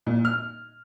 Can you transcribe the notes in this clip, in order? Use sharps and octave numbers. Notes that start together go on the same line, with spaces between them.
A#2
F6